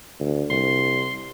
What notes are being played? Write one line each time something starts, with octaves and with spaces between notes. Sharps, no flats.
D2
C2 C6